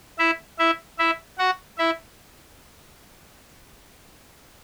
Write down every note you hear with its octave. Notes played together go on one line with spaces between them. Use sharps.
E4 E5
E4 E5
E4 E5
F#4 F#5
E4 E5